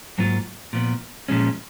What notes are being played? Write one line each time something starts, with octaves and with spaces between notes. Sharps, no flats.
G#2 F#3 A#3 F4
A#2 F3 B3
A#2 F3 G#3 C#4